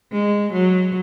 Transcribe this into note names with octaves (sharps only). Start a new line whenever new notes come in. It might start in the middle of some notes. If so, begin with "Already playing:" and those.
G#3
F#3